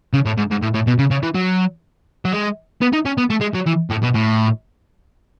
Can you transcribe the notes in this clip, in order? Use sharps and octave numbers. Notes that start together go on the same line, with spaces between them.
C#3
A2
G#2
G#2
A2
A2
B2
C#3
C#3
E3
F#3
F#3
G#3
B3
D#4
C#4
B3
A3
G#3
F#3
E3
A2
B2
A2